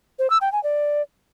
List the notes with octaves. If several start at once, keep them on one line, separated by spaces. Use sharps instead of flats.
C5
E6
G5
G#5
D5